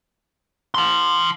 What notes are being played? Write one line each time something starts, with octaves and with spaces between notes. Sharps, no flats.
A5 C6